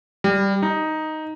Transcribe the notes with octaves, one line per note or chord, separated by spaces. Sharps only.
G3
D#4